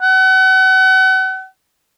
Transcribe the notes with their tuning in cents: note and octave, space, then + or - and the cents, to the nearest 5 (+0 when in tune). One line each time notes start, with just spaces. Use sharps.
F#5 +35